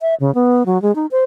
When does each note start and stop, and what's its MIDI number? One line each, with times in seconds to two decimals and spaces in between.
0.02 0.15 76
0.20 0.33 49
0.35 0.66 59
0.66 0.81 54
0.82 0.94 56
0.95 1.06 63
1.11 1.24 72